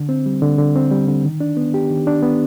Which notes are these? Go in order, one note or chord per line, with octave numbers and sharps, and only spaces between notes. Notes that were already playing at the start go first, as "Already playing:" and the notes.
Already playing: D3
C4
G3
D3
D3
C4
G3
D3
D#3
D4
B3
G4
D#3
D4
B3